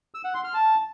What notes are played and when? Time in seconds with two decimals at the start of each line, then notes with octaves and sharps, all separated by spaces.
0.14 E6
0.24 F#5
0.34 C6
0.44 F6
0.54 A5